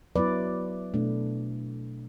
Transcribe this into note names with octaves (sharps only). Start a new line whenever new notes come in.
F#3 B3 E4 B4 D5
B2 A3 D4